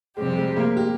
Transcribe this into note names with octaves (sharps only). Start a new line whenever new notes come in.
F2 C3 G3 G#3 C4 G4
G#3
A#3
G4